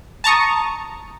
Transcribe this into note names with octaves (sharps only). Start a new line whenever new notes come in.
A5 A#5 C#6 D#6